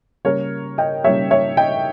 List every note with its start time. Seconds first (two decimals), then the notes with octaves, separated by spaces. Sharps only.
0.25 C#3 G3 A#3 A#4 C#5
0.78 D#5 G5
1.04 C#3 G3 A#3 C#5 E5
1.31 C#5 E5
1.57 D#5 G5